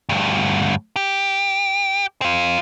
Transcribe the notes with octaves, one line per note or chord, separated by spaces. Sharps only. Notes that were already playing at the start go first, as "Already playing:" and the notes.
D2 G2
G4
C4 F4